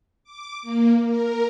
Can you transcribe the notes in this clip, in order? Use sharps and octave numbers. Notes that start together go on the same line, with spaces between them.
D6
A#3
A#4